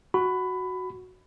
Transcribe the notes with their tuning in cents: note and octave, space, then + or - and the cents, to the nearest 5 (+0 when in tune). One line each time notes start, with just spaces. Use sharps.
F#4 +0 B5 +20